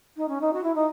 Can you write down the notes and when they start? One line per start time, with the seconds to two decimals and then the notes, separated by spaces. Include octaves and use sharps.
0.17 D#4
0.28 C#4
0.41 D#4
0.53 F#4
0.63 E4
0.75 D#4